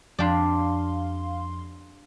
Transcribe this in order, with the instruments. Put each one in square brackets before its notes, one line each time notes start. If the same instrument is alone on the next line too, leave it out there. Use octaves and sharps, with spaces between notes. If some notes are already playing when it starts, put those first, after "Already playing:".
[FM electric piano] F2 F5 C6 [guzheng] D4 G4 D5